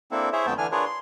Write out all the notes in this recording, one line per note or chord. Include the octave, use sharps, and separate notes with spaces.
A#3 C4 D4 E4 A4
E4 G#4 C5 C#5 E5
F2 D3 A3 B3 G5 A5
D3 E3 D4 G#5 F6
D4 F4 G#4 A#4 B4 C#5
C6